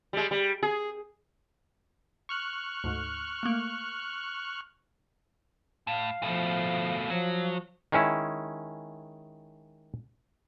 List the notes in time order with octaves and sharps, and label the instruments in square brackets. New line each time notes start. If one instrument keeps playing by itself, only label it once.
[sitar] G3 G#3
G3
G#4
[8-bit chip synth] C#6 F6 F#6
[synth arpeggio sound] D2 G#2
A3 A#3
[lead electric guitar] A2 [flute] F5
[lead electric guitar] B2 A3 [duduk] F3
[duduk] F3 [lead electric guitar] F#3
[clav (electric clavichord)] D#3 G#3 C#4 E4